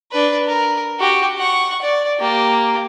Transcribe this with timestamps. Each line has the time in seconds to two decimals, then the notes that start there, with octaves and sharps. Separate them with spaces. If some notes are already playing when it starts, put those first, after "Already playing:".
0.12 D4 B4
0.47 A#4
0.99 F#4 G4
1.37 F#5 C#6
1.82 D5
2.19 A#3 G4